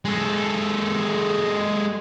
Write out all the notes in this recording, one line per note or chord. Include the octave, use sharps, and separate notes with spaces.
G#3 A4